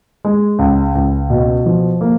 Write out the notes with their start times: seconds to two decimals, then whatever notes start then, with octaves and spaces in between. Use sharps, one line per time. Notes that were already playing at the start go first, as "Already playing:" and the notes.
0.25 G#3
0.59 C#2
0.95 C#2
1.30 B2
1.66 F3
2.01 A#3